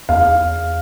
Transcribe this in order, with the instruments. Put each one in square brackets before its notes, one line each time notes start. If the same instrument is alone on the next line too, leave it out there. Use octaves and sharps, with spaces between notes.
[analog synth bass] E2 [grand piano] F5